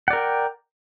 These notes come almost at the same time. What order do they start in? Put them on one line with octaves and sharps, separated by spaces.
F#5 D5 A#4 G5